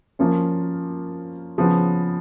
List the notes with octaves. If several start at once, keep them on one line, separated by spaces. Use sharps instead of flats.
F3 A#3 C#4 F4
C#3 F3 B3